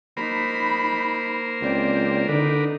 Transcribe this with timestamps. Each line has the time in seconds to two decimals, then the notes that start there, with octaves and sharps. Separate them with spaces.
0.17 A#3 D#4 A#4 C5 B5
1.62 C#2 C4 D5
2.28 D3 D4 D#4 A#4 B4